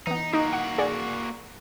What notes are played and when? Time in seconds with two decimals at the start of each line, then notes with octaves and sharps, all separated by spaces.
0.07 E3 B3 D#4
0.33 A#3 D#4 F#4
0.53 F#5
0.78 G#4 D5 F#5